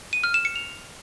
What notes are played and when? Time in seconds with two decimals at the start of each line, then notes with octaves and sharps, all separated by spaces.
0.13 D#7
0.24 F6
0.34 E7
0.45 C#7
0.56 F7